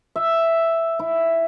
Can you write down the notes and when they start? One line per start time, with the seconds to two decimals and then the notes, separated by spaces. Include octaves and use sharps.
0.16 E5
0.99 E4